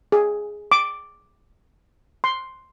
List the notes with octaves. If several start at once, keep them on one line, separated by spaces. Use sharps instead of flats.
G#4
D6
C6